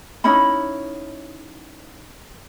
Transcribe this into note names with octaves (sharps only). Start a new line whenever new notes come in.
C#4 D#4 E4 B5